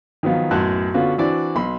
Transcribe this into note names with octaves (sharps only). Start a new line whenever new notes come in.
D#3 F3 F#3 B3 F4
B1 F#2 A2 F#3 A5 F#6
D3 B3 C#4 F4 F#4
E3 C4 D4 E4 F#4 D5
B1 B5 C6